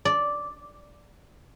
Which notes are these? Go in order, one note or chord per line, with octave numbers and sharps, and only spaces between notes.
D5